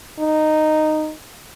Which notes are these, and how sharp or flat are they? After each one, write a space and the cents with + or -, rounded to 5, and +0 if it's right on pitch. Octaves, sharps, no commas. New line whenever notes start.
D#4 -10